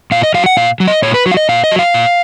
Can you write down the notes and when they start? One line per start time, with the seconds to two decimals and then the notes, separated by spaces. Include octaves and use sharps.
0.11 A#2 F5
0.23 D#5
0.34 F#3 F5
0.46 F#5
0.57 A#2 F5
0.80 F#3
0.88 D#5
1.02 A#2 C#5
1.14 B4
1.26 F#3
1.32 F5
1.37 D#5
1.49 A#2 F5
1.64 D#5
1.71 F#3
1.79 F5
1.94 A#2